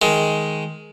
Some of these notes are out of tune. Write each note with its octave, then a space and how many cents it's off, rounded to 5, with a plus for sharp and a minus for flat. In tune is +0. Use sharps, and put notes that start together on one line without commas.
D#3 +15 G#3 +10